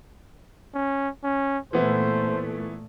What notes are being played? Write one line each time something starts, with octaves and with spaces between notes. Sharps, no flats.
C#4
C#4
A#2 E3 A3 B3 E4 C5